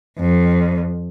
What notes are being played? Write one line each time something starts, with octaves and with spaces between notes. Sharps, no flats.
F2